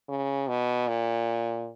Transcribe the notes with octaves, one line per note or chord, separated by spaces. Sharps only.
C#3
B2
A#2